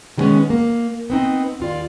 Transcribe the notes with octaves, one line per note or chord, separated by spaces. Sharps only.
D#3 G3 G#3 B3 C#4
A#3
B3 C4 D#4
D#2 F4 D5